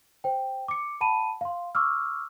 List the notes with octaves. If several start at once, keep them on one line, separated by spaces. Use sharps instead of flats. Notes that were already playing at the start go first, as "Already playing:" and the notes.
C5 G5
D6 C#7
F#5 A5 B5 D#7
F5 C6
C#6 D6 E6 F6